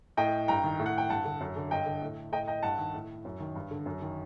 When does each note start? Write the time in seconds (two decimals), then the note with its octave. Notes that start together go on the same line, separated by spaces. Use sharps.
0.17 A2 D#5 G5
0.48 G2 G5 A#5
0.64 D#3
0.79 A2
0.86 F#5
0.98 G5
1.10 G2 F#5 A5
1.25 D3
1.40 F#2
1.56 D3
1.71 G2 D#5 G5
1.86 D3
2.02 A2
2.32 A2 D#5 G5
2.48 D#5 G5
2.63 G2 F#5 A5
2.78 D#3
2.94 A2
3.25 F#2
3.40 D#3
3.55 G2
3.71 D3
3.86 F#2
4.02 D#3